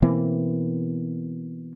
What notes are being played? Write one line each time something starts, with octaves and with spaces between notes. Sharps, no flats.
B2 E3 A#3 C4